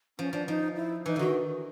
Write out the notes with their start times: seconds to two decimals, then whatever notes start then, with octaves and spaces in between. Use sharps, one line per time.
0.19 F3 C#4
0.33 F3 D4
0.48 F3 D#4
0.76 E4
1.05 E3 D#4
1.16 D3 D#3 F#4